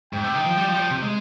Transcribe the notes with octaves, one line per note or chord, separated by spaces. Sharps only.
G#2 G5
C3
D#3
F3
G3
F3
G3
F3
C3
G#3